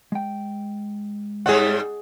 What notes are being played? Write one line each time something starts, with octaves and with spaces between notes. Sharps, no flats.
G#3 G5
G#2 G3 C4 G#4 F#5